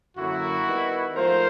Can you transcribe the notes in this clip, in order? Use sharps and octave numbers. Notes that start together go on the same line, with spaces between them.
F#2 D3 F#3 A#3 E4 F#4
D#3 G3 B3
G#2 F3 A3 A#4 C5